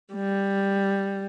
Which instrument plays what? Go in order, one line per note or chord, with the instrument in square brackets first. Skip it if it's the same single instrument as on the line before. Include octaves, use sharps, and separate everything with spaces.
[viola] G3